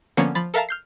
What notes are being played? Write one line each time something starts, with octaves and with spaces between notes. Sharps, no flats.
D3 F3 A#3 B3 C#4
F3 B5 A6
A4 A#4 E5 F5 A5 A#5
F6 G6 C7